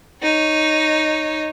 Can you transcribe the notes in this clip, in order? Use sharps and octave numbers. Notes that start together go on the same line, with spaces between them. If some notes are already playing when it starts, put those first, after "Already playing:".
D#4 C#5